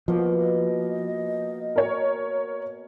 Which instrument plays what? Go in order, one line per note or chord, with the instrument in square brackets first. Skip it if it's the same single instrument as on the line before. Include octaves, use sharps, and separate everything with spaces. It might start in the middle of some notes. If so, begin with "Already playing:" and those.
[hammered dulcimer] B2 A#3 [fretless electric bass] F3 [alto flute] F#4
[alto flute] D#5
[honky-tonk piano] A#4 C#5